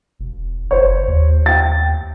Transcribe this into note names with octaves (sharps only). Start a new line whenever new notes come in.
E1
F#1 C5 C#5
D#2
G5 A6